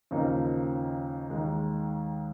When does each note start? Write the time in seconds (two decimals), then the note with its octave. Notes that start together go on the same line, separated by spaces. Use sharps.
0.11 D#2 C#3 F3 A#3 D#4
1.30 D#2 D#3 G#3